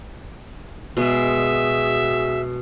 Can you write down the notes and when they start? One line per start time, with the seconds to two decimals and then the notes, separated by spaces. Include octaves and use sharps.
0.97 B2 G#3 F#4 G#4 E5